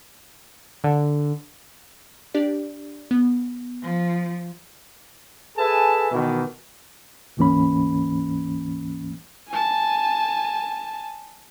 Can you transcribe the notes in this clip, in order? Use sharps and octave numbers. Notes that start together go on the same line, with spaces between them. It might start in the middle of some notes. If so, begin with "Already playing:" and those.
D3
D4 G4 D5
B3
F3
G#4 A4 B4 E5 G#5 A5
B2 D#3 E3
D2 G#2 E3 A#3 C#4 B5
G#5 A5